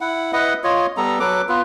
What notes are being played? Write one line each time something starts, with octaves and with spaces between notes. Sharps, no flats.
E4 F#5
E4 B4 D#5 F#5
F4 C#5 D#5
G3 B3 A4 A#5
F#3 A4 B4 D6
B3 F4 B4